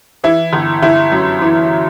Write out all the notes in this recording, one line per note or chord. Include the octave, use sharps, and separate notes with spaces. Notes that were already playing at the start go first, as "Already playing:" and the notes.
E3 E4
G1
G1 E4
F#2
E3